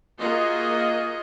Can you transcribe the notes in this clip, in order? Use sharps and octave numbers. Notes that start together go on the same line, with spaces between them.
A#3 F4 F#4 G#4 D#5